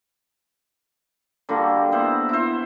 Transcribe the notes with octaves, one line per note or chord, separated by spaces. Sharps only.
D3 G3 A#3 F#4
B3 E4 C5 F#5
E4 C5